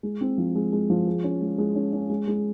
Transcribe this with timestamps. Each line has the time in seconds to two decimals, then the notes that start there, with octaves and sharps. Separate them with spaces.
0.03 G#3
0.21 C4
0.38 F3
0.55 G#3
0.73 G#3
0.90 F3
1.07 G#4
1.24 C#4
1.41 G#3
1.58 G#3
1.75 C#4
1.93 C#4
2.10 G#3
2.27 G#3